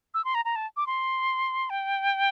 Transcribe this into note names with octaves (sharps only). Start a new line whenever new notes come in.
E6
C6
A#5
A#5
A5
D6
C6
G5